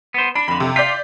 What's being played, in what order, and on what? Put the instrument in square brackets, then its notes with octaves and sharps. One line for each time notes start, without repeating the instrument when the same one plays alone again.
[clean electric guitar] B3 C5
[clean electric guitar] D4 [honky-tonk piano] B5
[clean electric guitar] F2 D3 [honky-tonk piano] B5
[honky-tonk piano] C3
[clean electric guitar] F4 [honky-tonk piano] D5 G6 B6